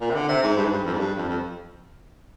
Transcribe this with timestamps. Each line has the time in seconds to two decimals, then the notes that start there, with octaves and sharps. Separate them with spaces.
0.01 A#2
0.10 C3
0.15 D3
0.28 C3
0.43 G#2
0.57 G2
0.65 G#2
0.71 G2
0.84 F2
0.94 G#2
0.99 G2
1.17 F2
1.29 F2